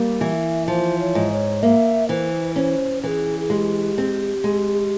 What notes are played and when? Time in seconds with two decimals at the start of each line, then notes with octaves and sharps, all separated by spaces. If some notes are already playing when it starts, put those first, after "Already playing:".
Already playing: G3 A#3
0.21 E3 E5
0.68 F3 C5
1.00 C#5
1.15 G#2
1.31 C#5
1.63 A#3 E5
2.09 E3 C5
2.56 C#4 C5
3.03 E3 G#4 C5
3.40 G#4
3.50 G#3 G4
3.98 C4
4.44 G#3